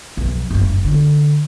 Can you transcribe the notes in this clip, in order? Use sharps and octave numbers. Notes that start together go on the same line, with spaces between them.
B1 F2
F#1 G2
D3